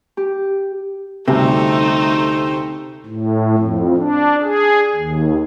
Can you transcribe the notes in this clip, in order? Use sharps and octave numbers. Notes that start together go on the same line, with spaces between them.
G4
D2 C3 G3 A3 D#4 C5 G5
A2
F2
D4
G#4
D#2